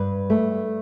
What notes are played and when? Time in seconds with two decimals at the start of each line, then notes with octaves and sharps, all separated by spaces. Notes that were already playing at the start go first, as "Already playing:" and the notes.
Already playing: G2 B4
0.30 A3